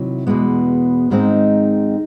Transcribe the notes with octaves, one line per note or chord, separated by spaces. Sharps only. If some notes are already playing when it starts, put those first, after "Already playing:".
Already playing: C3 D#3 F#3 E4
E2 B2 G#3 B3
G#2 D#3 G#3 C4 D#4